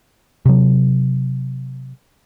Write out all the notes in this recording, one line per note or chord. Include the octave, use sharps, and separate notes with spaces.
C3 F#3